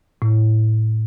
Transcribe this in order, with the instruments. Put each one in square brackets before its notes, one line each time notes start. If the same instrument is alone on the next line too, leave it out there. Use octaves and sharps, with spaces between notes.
[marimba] A2